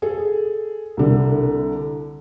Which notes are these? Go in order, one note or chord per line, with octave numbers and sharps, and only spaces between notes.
G#4 A4
C2 D3